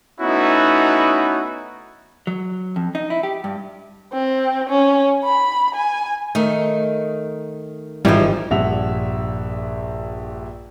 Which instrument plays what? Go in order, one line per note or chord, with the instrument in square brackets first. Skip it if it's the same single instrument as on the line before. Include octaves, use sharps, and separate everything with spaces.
[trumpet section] A3 B3 C#4 D#4 E4 F#4
[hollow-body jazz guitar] F#3
F2
D#4
E4
G4
G2
[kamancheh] C4
C#4
B5
G#5
[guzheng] D#3 D#4 [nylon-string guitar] A3
[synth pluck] G#1 G3 [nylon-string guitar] E3 F3 [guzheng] D#4 G4
[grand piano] A#1 G2 E5 F#5 F7